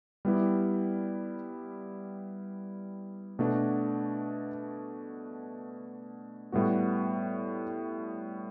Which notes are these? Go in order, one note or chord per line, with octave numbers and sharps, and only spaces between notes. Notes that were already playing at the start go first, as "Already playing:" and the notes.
G3 B3 E4 G4
B2 A3 D4 F#4
A2 G3 B3 F#4